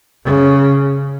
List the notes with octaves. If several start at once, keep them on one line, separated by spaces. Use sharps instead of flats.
C#3